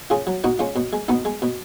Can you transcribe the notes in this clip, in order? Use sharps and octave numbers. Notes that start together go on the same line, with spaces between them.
C#3 F4 G#4
F#3
B2 D#4 F#4
G#3 C#4 F4
B2
G#3
B2 B3 D#4
G#3
B2